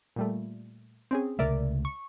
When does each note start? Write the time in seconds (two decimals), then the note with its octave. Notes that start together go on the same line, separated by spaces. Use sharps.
0.16 A#2 G3 A3
1.11 C4 C#4 G#4
1.39 C#2 C3 A3 A#4 D5 E5
1.85 C#6